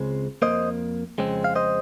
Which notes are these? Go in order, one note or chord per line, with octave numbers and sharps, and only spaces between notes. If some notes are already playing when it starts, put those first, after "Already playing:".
Already playing: C#2 C#3 G#3 C4
F2 D#3 A#3 C5 D#5
F2 C#3 G#3 C4
F5
C5 D#5